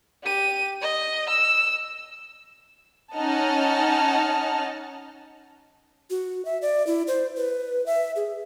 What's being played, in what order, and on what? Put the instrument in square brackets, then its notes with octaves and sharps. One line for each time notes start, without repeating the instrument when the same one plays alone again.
[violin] G4 D#7
D#5
E6
[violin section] C#4 D#4 D#5 F#5 A5 F6
[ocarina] F#4
E5
D5
E4
C5
B4
E5
G#4